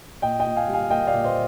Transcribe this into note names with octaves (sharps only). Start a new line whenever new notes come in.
A#2 D#5 G5
D#5 G5
A#2
F5 G#5
G3
F5 G#5
A#3 D#5 G5
D5 F5
A#2
C5 D#5